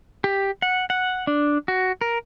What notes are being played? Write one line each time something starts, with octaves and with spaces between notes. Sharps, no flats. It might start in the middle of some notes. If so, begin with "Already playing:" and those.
G4
F#5
F#5
D4
F#4
A#4